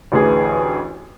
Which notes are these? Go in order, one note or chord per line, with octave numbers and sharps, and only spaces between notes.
A1 D2 E3 G#4 G#5